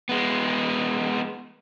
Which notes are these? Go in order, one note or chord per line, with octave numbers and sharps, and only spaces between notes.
G#3 B3